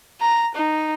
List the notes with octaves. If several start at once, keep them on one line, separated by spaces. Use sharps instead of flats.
A#5
D#4